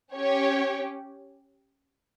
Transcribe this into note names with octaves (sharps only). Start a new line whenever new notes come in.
C#4 G4 C#5